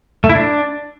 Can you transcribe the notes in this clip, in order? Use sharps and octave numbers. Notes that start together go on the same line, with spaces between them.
A3
E4
D4